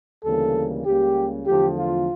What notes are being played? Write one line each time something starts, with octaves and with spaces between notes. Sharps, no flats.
D2 C#3 E3 G3 A#3 A4
C#2 C#3 G3 A#3 G4
E2 D3 F3 A3 G4
F4